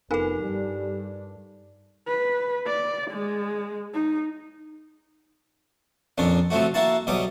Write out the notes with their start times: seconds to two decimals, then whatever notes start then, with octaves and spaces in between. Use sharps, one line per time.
0.11 F1 B3 D#4 F4 A4 A#4 G#5
0.41 G2 G3 D4
2.08 B4
2.67 D5
3.11 G#3
3.94 D#4
6.18 F2 A#2 C#4 D4
6.50 C3 F3 F#3 A3 F#4
6.74 A#3 E4 F#4 A5
7.07 B1 B2 F#3 G3 D6 D#6